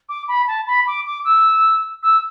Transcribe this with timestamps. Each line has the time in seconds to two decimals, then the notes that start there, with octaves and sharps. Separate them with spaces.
0.09 D6
0.28 B5
0.47 A5
0.67 B5
0.87 D6
1.05 D6
1.24 E6
2.02 E6